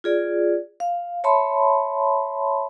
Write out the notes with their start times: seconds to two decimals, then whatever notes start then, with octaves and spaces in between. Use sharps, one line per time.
0.04 F4 G#4 D5
0.80 F5
1.24 C#5 E5 A5 B5 C6